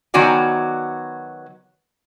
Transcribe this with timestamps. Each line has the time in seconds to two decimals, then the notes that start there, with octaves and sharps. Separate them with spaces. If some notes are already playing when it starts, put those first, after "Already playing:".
0.14 D#3 F#3 B3 F#4 D5 G#5